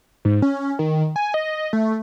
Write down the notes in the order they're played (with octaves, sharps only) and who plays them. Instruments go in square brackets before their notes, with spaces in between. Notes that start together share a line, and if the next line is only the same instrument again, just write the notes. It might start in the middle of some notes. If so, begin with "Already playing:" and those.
[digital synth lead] G#2
C#4
D#3
G#5
D#5
A3